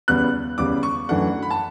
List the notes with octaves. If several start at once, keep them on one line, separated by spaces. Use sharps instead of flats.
E2 C#3 G3 B3 F#6
E2 C#3 G3 B3 D6
C#6
F#2 E3 A3 D4 F#5
B5
A5